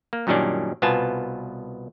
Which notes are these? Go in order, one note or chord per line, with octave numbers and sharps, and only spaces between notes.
A#3
F#2 A#2 D#3 G3 C#4 D4
C2 B2 B3 F4 G#5 A5